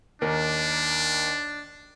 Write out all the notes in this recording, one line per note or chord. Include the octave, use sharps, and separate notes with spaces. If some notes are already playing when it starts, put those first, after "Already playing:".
D#2 D4 A#4